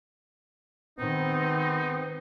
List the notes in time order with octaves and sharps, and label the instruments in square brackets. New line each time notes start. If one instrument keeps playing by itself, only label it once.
[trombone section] G#1 B3 C4 [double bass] D#3 [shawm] D#4